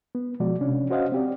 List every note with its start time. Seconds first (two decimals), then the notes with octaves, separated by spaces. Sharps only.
0.15 B3
0.40 B2 F3 G#3 F#4 D5
0.61 C3 C#4 D4
0.90 C#4 F#4 C5 D#5 F5 F#5
1.12 C4 G4 D5